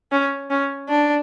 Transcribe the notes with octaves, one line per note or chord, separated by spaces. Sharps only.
C#4
C#4
D4